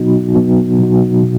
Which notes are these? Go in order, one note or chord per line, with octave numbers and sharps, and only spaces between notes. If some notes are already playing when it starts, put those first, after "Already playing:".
Already playing: B2 F#3 B3 D#4 F#4
B2 F#3 B3 D#4 F#4
B2 F#3 B3 D#4 F#4
B2